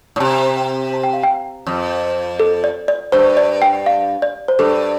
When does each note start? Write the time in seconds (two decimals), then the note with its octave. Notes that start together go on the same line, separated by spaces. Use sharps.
0.16 A2
0.20 C3 A5
0.57 G5
0.93 A5
1.03 G5
1.13 F5
1.24 G5
1.67 F2
2.40 A4
2.64 D5
2.88 D5
3.12 G2 C5
3.37 D5
3.62 G5
3.86 F5
4.22 D5
4.48 C5
4.59 G2 A4